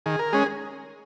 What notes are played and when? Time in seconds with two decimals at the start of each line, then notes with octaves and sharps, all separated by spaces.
0.06 D#3 G#4
0.19 A#4
0.33 G#3 C#4 G#4